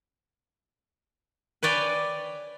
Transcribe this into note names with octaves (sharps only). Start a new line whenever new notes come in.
B4 C#5 D5 G5 G#5